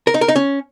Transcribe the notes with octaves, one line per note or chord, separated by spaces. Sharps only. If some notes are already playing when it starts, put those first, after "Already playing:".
A#4
D#4
A#4
D#4
C#4